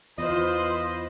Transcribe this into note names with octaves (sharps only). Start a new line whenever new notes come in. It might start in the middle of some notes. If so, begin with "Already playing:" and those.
E2 F4 B4 C5 D#5